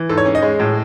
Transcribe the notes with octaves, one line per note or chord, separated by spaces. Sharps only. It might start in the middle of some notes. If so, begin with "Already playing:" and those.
Already playing: E3
G#2 A4
C#5
C#4
D#5
G#3
A2